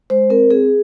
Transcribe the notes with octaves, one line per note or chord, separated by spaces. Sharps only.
G#3 C5
C4 A#4
C4 G#4